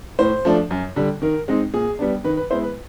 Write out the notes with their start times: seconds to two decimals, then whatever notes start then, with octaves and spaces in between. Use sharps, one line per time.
0.19 A2 C5
0.45 F3 A3 D4
0.71 F#2
0.96 D3 G3
1.22 D#3 A#4
1.48 G#3 C4 D#4
1.74 A#2 G#4
1.99 G3 B3 D4
2.24 D#3 B4
2.37 B4
2.50 G#3 B3 E4 C5
2.63 B4